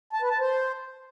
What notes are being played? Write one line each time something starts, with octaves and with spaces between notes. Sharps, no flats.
A5
B4
A5
C5